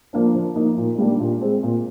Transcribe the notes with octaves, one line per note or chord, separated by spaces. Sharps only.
F3 A#3 D4
F3
A#3 D#4
A#2
G3 A#3 D4
A#2
G#3 C4
A#2